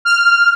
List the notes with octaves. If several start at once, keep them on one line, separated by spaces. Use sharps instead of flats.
F6